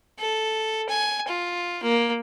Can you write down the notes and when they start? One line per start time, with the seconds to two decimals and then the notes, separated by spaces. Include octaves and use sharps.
0.19 A4
0.90 G#5
1.29 F4
1.83 A#3